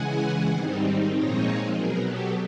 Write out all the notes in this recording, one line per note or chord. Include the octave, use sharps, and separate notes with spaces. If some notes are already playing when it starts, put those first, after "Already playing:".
Already playing: C#3 E3 G#3 F#5 G#5
G#2 D#3 G3 C4 D#4
A#2 F3 G#3 C4 D#4 C#5 D#5
B2 F#3 B3 G#4 A#4
G4 A4